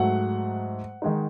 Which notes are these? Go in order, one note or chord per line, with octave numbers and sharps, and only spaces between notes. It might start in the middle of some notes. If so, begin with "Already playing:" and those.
Already playing: G#2 F#3 A3 F#5
D#3 G#3 D#4